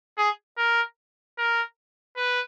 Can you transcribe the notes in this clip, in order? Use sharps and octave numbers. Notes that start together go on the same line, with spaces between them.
G#4
A#4
A#4
B4